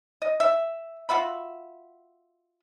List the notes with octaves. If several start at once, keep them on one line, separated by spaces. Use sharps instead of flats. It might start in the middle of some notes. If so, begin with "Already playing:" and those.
D#5
E5
F4 F#4 E5 B5